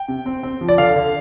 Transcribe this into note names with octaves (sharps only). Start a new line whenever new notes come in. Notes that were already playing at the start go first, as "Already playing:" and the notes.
Already playing: G5
C3
C4
C4
F3
D5
D3 F5
D3